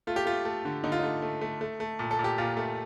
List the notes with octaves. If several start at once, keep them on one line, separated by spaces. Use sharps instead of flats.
A3 F4
G4
A3 F4
A3
D3
D3 D#4
F4
A3 D#4
A3
A3
A3
A3
A#2
A4
A#2
G4
A#2 F4
A3